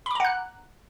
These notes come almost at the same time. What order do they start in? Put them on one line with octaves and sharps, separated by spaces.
B5 D6 A#5 F#5 F#6